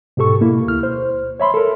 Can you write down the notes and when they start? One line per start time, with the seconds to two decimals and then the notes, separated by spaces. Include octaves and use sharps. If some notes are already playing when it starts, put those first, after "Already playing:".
0.17 G#2 B2 G4 A4 C#6
0.41 B2 A#3 E4
0.67 D2 F6
0.83 C5
1.40 C#5 E5 B5 C6
1.54 A4 A#4